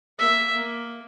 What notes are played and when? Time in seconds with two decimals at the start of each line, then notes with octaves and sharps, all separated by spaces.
0.19 A#3 E5
0.56 A#3